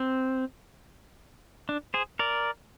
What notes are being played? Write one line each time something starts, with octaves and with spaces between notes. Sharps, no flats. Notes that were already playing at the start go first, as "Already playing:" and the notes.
Already playing: C4
D4
G#4 C5
A#4 D5